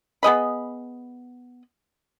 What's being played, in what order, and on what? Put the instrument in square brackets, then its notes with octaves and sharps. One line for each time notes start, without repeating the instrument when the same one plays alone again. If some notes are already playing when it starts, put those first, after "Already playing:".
[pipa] B3 G#4 D#5 B5